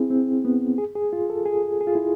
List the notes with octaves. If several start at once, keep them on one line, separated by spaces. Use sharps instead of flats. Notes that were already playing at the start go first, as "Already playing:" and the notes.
Already playing: C4 E4 G#4
C4
B3
G#4
G#4
F4
A4
G#4
G#4
F4
E4